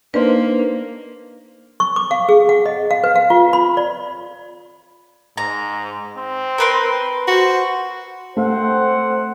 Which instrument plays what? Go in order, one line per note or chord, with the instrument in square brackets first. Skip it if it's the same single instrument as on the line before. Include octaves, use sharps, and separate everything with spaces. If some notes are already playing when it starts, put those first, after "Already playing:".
[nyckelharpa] A#3 [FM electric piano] D4 D#4 C5 [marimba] B4
[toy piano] C#6
D6
F5
G#4
F#5
D#5
F5
B4
F5
F4
B5
D5
[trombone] G#2 [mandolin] A#5
[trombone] C4
[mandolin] A#4 B4 C6
[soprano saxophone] F#4 [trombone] C5
[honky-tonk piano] A3 [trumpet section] C4 F#5 [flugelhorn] C5